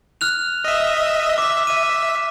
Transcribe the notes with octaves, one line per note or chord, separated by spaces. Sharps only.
F6 F#6 F7
D#5 E5
E5 D6 B6
D#7